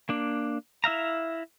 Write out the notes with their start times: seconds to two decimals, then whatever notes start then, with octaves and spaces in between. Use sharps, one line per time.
0.09 A#3 D4
0.84 E4 E5 F5 A#5